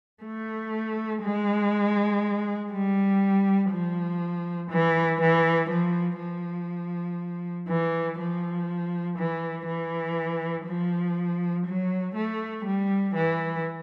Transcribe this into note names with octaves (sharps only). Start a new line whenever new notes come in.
A3
G#3
G3
F3
E3
E3
F3
F3
E3
F3
E3
E3
F3
F#3
A3
G3
E3